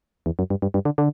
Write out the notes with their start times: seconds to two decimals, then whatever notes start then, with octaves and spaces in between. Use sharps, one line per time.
0.26 E2
0.39 F#2
0.50 G2
0.62 G2
0.74 G2
0.85 D3
0.98 D3